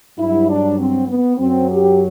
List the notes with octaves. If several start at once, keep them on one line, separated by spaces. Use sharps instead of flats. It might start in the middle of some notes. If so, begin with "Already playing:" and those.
G2 F#3 E4
D4
C4
B3
F#2 F#3 C4
G4